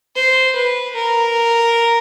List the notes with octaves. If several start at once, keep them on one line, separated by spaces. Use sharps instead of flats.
C5
B4
A#4